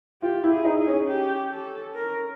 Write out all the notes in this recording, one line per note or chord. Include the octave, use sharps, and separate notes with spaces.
F4 G4
E4
G#4
D#4
G#4
C#4
G4
A4
A#4